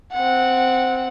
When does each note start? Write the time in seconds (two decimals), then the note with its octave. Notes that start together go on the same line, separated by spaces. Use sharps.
0.13 C4 F#5